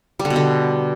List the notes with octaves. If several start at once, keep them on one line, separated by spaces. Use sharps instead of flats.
G3
D3
B2
D3